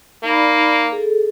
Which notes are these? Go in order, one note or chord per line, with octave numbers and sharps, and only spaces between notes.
A#3 D#4 D5 B5
G#4 A4